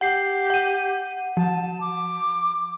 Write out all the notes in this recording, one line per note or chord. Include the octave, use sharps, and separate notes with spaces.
G4 F#5 C7
F#5 D#7
F3 A5
D6